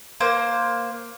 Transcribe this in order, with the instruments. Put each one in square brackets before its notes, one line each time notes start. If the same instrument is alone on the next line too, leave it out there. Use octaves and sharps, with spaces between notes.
[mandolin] A#3 C5